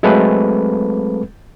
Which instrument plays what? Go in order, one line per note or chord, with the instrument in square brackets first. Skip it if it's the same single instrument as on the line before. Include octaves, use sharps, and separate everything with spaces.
[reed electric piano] F#3 G#3 A3 C4 A4 B4